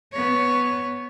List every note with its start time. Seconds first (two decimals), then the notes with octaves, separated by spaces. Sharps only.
0.13 B3 C#5